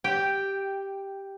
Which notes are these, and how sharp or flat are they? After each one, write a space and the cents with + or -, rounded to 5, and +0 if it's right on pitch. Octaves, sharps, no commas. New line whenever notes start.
G4 +0 G5 +0